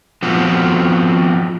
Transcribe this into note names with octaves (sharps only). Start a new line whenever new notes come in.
F3 B3 C4 F4 F#4